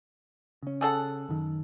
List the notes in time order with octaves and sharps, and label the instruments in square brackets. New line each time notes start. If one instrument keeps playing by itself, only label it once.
[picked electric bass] C#3 C#4
[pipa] G#4 A4 F#5
[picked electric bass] F#2 D#3